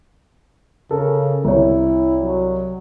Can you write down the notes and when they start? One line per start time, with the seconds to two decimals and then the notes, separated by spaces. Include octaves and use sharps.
0.91 C#3 A4 A#4
1.45 C2 E4 C#5
2.21 F#3